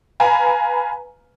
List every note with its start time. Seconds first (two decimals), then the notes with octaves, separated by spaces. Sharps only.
0.20 B4 F5 G#5 A#5 B5